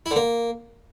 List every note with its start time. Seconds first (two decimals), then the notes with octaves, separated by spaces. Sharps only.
0.06 E4
0.11 D3
0.16 A#3